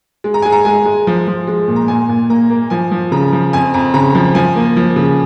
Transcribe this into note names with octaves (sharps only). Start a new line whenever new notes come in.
G#3
A#5
G#3 G#5
A#5
G#3 G#5
G#3
F3
F3
G#3
A#2
A#5
A#2 G#5
A#2
A#3 A#5
A#3
F3 G#5
F3
C#3 A#5
F3
F2 G#5
F2 A#5
C#3 A#5
F3
F3 G#5
A#3
F3
C#3